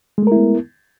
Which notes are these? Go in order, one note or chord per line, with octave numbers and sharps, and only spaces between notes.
G#3 A3 B3 E4 A#4